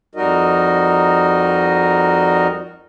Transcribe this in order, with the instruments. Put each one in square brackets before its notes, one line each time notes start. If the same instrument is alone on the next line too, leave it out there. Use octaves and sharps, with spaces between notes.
[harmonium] F2 G3 D#4 F#4 A#4 D#5